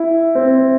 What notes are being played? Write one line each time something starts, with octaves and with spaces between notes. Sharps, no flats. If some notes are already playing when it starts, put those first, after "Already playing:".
Already playing: E4
C4